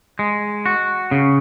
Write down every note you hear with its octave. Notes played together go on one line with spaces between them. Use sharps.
G#3
F#4
C#3